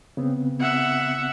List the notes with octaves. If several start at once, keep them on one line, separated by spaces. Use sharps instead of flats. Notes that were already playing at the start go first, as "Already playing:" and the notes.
C#3 B3 C4
E5 F#5